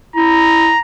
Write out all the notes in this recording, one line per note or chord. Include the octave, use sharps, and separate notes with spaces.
E4 A#5